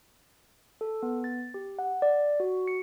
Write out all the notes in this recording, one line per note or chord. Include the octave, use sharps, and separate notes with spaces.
A4
B3
A6
G4
F#5
D5
F#4
C#7